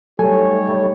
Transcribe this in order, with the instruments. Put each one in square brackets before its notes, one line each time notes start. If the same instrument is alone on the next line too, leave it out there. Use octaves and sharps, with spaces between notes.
[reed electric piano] F#3 A4 G#5 [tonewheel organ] G3 A3 [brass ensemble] D#4 G4 C#5